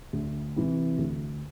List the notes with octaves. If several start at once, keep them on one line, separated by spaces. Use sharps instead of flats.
D2
C3 E3
D2